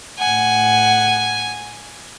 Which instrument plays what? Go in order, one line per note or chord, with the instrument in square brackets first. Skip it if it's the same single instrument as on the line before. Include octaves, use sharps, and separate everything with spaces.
[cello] A2 F#5 [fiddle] G#5